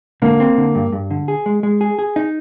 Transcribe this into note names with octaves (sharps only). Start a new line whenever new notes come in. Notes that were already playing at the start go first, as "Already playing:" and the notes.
D3 A#3
C4
D3
G2
G2
D3
G#4
G#3
G#3
G#4
G#4
D#4